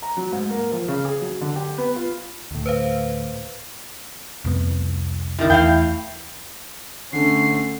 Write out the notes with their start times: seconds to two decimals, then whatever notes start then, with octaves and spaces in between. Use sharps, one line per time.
0.02 A#5
0.17 F#3
0.32 G#2
0.50 A#3
0.72 F3
0.88 C#3
1.05 G#4
1.21 F#3
1.41 D3
1.55 G4
1.78 B3
1.96 F4
2.51 D2 A2
2.66 B4 C5 F5
4.45 C2 F2 B3
5.39 C3 D#3 E4
5.50 E2 A3 F5 G5
7.13 D3 A3 C#4 C7